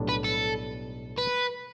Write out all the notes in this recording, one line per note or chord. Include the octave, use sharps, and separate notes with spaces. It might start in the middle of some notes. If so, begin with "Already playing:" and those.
Already playing: B1 A2 G3 D4
B4
A4
B4